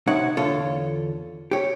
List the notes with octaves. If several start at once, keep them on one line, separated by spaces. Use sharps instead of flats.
C3 D#4 C#5 F#5
E2 D3 F4 A4 C#5
G4 C#5